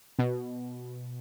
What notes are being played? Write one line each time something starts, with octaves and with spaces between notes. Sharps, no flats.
B2